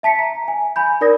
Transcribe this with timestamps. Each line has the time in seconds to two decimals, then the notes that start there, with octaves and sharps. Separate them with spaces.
0.03 E5 A5 B6 C#7
0.19 A#5
0.44 E5 G#5
0.76 G#5 B5 G6
1.01 D#4 A#4 D5 D#6 A#6